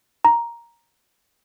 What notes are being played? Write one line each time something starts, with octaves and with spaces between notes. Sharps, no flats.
A#5